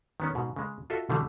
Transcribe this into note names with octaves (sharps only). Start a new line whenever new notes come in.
D#3 B3 C#4
G#2 B2
C#3 G#3
F4 F#4 A4 D#5 E5
B2 D3 E3 G3 A3